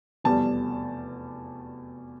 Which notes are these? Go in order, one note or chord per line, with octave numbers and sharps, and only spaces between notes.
F1 E2 B2 G3 A5